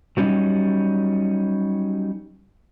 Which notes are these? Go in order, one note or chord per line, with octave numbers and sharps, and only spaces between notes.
F#3 G3 C#4 D#4